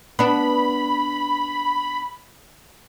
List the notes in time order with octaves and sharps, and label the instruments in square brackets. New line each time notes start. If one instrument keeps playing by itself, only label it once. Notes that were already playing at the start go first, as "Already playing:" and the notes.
[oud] B3 D4 [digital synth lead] B5